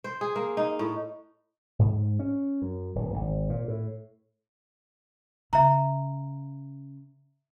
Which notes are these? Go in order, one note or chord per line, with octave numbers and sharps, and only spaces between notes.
C5
G#4
A#3
D#4
A2
G#2
C#4
F#2
D1
G#1
A#2
A2
C#3 E5 A#5